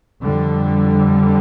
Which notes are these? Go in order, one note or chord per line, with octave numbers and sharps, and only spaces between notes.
F2 D3 G3